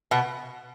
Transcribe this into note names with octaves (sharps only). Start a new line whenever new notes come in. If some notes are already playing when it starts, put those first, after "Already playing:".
B2 B3